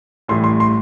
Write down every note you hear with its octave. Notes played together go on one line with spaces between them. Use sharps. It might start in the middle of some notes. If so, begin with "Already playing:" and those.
A1 A2 G3 C6
C6
C6